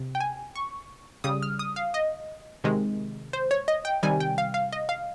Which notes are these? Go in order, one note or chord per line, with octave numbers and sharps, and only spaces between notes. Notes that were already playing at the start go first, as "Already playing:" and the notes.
Already playing: C3
G5
G#5
C#6
C#3 G3 D#6
F6
D#6
F5
D#5
C3 D#3 G#3
C5
C#5
D#5
G5
C3 D#3 G3 G#5
G5
F5
F5
D#5
F5